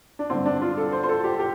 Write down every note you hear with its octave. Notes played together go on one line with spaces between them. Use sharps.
D4
G2 D3 C4
D4
F4
A4
C5
C5
A4
G4
G4